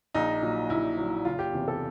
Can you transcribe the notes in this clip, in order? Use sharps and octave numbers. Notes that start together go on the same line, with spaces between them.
A#1 D#4
A#2 F#3
A#1 E4
F#3
A#2
F#1 F4
G4
E2 C3 E3
A4